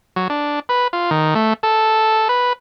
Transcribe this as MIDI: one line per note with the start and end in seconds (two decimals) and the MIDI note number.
0.16 0.28 54
0.30 0.60 62
0.69 0.88 71
0.93 1.10 65
1.11 1.34 51
1.35 1.53 57
1.63 2.28 69
2.29 2.53 71